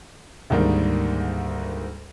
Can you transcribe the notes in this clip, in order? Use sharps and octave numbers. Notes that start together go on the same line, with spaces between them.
D2 G#2 D#3 G3 A#3